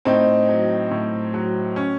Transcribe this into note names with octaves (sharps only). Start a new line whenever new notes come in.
A2 C4 D#4
F#3
A2
F#3
C#4